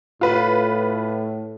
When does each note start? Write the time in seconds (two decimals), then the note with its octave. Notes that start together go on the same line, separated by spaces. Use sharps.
0.21 A2 F4 B4